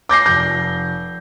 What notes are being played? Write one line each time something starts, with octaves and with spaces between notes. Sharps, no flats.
D6 G6 A#6 C7
F1 G6